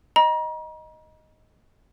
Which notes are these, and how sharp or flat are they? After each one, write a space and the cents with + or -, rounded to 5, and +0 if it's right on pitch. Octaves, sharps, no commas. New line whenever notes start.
D#5 +0 A#5 +40